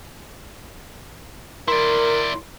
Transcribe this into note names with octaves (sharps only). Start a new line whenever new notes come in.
E4 A#4 D5 C6